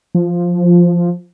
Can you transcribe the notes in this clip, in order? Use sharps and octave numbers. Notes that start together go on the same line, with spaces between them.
F3